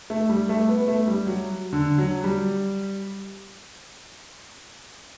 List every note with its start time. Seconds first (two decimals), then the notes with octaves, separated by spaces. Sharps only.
0.10 A3
0.29 G3
0.49 A3
0.69 B3
0.88 A3
1.07 G3
1.27 F#3
1.73 D3
1.98 F#3
2.24 G3